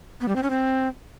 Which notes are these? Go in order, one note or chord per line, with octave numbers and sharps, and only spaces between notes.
B3
G3
C4
C#4
C4